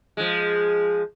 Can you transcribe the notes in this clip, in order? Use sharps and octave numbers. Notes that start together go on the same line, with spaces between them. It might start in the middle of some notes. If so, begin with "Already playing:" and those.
F3 G#3